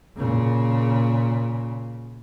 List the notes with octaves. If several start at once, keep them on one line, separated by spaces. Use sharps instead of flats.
A#2 C#3